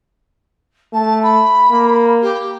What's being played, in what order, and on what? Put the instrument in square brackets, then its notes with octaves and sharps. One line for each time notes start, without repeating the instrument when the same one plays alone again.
[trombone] A3 [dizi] A5
[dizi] B5
[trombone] A#3
[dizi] G4